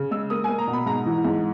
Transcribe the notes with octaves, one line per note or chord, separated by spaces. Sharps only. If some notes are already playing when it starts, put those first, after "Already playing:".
Already playing: C#3
G#3 E6
A#3 D#6
A#3 G#5
A#5
B2
B5
G#2 A#5
E3
G#2